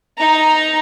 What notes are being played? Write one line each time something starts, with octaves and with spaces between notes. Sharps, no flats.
D#4 A#5